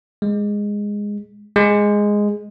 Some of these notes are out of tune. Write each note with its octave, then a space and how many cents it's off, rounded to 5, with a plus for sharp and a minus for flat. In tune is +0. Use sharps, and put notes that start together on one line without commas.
G#3 -10
G#3 -5